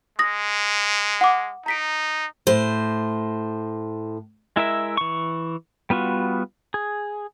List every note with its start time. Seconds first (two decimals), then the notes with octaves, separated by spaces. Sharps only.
0.19 G#3 D#6 A#6
1.21 F#5 D6
1.66 D#4 A#5 B6 D7
2.47 A2 C5
4.56 G#3 E4 A#4 E5
4.97 E3 C#6
5.90 G3 B3 F4 F#4
6.74 G#4